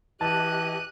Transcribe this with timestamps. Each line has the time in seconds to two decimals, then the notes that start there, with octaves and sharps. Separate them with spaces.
0.21 E3 G4 D#5 A5 F#6 D#7